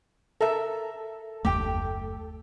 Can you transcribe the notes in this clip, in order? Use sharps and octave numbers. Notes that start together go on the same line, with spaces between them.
A4 A#4 E5
F#1 D#2 A3 G4 G5